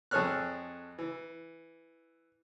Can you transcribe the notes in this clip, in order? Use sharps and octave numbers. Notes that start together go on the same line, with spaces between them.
F2 G#4 A4 C#5 F6 F#6
E3